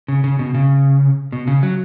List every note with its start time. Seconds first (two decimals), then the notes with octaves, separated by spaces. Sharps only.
0.08 C#3
0.24 C#3
0.39 B2
0.55 C#3
1.32 B2
1.47 C#3
1.63 F#3